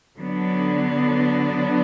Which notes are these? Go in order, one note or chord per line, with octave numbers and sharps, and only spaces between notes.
D3 F#3 B3 D4